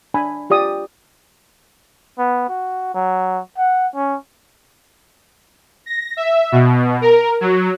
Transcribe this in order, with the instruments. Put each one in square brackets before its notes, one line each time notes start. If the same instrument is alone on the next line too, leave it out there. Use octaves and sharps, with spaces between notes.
[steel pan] D4 G#5 B5
F4 G4 D5 D#6
[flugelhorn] B3
F#4
F#3
F#5
C#4
[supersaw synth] A#6
E5
B2
A#4
F#3